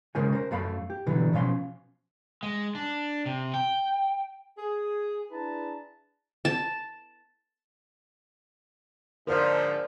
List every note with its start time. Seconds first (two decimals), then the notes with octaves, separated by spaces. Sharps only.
0.15 C#3 G#3 C#4 A#4 C5 G#5
0.33 A#4 C5
0.51 F#2 A3 F5 A#5 B5
0.90 G4
1.06 B2 D3 E3 F#3 G3
1.33 B2 F3 C#4 F5 C6
2.43 G#3
2.75 D4
3.26 C3
3.54 G5
4.57 G#4
5.31 D4 E4 G#4 B4 A5 A#5
6.45 A5
9.27 G#2 D3 F3 A#4 C5 D5